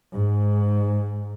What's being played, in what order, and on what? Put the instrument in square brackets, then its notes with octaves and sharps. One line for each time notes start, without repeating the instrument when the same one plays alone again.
[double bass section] G#2